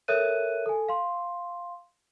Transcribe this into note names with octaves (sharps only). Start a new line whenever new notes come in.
A4 A#4 C#5 E5 F#6 D#7
A4 G#5
F5 C6